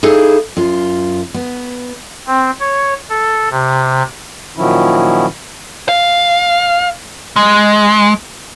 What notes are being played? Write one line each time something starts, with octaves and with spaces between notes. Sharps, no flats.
D#4 E4 G#4 A4 F5
F#2 F4
B3
C4
C#5
A4
C3
A#2 D#3 F3 F#3 C#4 E4
F5
G#3